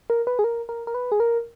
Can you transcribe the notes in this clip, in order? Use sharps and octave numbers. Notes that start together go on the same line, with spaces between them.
A#4
B4
G#4
A#4
A#4
A#4
B4
G#4
A#4